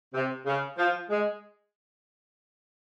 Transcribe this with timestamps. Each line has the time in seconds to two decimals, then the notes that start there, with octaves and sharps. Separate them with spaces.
0.14 C3
0.46 C#3
0.78 F3
1.10 G#3